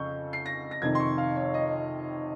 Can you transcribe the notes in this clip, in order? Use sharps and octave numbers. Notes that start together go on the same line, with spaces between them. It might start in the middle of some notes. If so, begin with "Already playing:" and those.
Already playing: F2 C#3 C#6 G6
C7
A#6
A#6
F2 C3 D#3 G#6
C6
C#6
F5
C#5
D#5